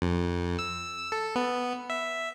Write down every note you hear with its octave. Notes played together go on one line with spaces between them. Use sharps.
F2
E6
A4
B3
E5